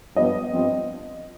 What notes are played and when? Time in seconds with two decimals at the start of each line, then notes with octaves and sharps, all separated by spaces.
0.16 G2 F3 B3 D#5
0.53 G2 F3 C4